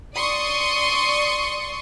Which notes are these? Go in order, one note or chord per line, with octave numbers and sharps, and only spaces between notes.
D5 C6 C#6 D#6